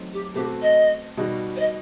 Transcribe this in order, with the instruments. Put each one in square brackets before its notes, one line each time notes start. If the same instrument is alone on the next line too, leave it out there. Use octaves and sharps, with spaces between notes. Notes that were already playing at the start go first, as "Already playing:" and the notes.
Already playing: [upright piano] F#3 A3 C4 D#4
[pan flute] G4
[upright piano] B2 A3 C4 F#4 [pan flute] G4
[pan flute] D#5
[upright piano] B2 G3 D#4 F#4
[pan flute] C5
D#5